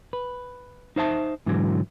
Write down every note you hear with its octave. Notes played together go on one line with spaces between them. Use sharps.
B4
D#4 C5 E5 A5
G#2 D3 E3 F#3